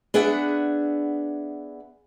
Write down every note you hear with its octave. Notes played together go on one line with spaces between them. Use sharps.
B3 D4 G#4 E5 F#5